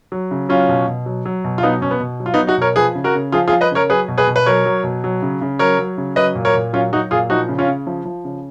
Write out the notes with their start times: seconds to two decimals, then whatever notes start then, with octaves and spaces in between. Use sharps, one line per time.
0.12 F#3
0.31 C#3
0.49 F#3 C#4 F4
0.69 B2
0.87 B2
1.06 F#3
1.25 F#3
1.44 B2
1.58 F4
1.63 F#3 B3 D#4
1.81 B2 C#4
1.91 B3
2.00 B2
2.20 F#3
2.26 F4
2.34 B3 D#4
2.39 F#3
2.47 D#4 F#4
2.58 B2 A#4 C#5
2.76 F3 G#4 B4
2.95 C#3
3.04 F#4 A#4
3.15 C#3
3.32 F3 F4 G#4
3.48 F4 G#4
3.53 F3
3.61 B4 D#5
3.71 C#3 A#4 C#5
3.89 F#3 G#4 B4
4.08 B2
4.18 G#4 B4
4.27 B2
4.36 B4
4.46 F#3 A#4 C#5
4.66 F#3
4.84 B2
5.04 F#3
5.22 C#3
5.41 C#3
5.59 F#3 A#4 C#5
5.79 F#3
5.98 C#3
6.16 F#3 B4 D#5
6.35 A#2
6.45 A#4 C#5
6.54 A#2
6.73 F#3 C#4 F4
6.92 F#3 D#4 F#4
7.11 A#2 F4 G#4
7.30 F3 D#4 F#4
7.48 C#3
7.58 C#4 F4
7.67 C#3
7.87 F3
8.05 F3
8.24 C#3